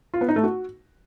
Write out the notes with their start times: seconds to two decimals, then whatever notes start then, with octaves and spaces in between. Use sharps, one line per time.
0.14 F4
0.21 B3
0.29 D#4
0.36 A3
0.44 F#4